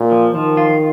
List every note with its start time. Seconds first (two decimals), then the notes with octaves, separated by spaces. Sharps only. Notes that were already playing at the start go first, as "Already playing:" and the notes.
Already playing: A#2
0.11 F3
0.35 D#3 F3
0.57 F4